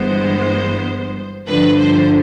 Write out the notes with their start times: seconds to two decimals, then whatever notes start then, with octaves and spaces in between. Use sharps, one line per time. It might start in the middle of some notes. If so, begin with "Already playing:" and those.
Already playing: G1 G2 E3 G#3 B3 C5
1.47 G2 D3 F3 B4
1.78 C5